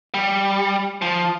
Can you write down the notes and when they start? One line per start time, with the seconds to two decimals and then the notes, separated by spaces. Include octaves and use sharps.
0.14 G3
1.02 F3